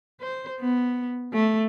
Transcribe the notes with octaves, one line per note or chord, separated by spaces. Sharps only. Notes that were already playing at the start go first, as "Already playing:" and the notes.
C5
B3
A3